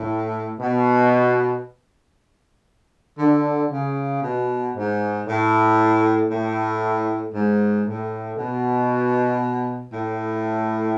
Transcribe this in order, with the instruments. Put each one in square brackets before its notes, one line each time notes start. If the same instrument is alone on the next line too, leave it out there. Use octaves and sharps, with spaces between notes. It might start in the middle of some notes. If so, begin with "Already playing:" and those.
Already playing: [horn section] A2
B2
D3
C#3
B2
G#2
A2
A2
G#2
A2
B2
A2